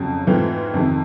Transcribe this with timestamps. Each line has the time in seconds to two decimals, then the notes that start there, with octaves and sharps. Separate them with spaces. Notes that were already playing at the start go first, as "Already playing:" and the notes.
Already playing: F2 C#3 F#3
0.27 G#2 E3 A3 C4 F4
0.74 F2 C3 D#3